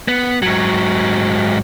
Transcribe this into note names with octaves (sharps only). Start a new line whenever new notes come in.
B3
G#2 F#3